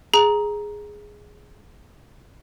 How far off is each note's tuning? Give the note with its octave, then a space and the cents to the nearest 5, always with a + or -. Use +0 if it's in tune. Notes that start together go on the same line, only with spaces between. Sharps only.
G#4 +0 A#5 +10